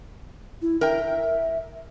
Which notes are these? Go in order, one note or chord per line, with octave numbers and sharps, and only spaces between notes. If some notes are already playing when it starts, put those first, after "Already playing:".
E4
A#4 E5 G5